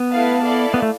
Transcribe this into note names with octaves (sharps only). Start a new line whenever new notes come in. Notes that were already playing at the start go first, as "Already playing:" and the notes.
Already playing: B3
A3 E4 B4 F5 A5
E4 A4 D5 F5
B3
A3